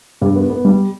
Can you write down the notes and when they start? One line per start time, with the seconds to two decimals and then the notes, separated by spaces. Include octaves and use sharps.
0.21 G2
0.36 B3
0.50 B3
0.65 G3